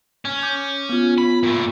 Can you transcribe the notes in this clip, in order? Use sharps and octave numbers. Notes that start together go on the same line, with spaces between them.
C#4
D6 G6
B3 F4
B5
A#2 A3